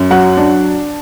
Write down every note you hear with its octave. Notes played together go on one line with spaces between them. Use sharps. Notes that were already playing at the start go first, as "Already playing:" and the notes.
Already playing: F#2
F#3 F#5
D4